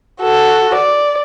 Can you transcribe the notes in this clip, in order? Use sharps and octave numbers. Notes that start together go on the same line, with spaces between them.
F#4 A4
D5